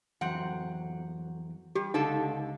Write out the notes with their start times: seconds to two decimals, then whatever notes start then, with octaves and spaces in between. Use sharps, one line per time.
0.21 F2 E3 F#3 C4 F#5
1.75 G3 G4
1.94 C#2 D3 D#4 A4 D#5 F5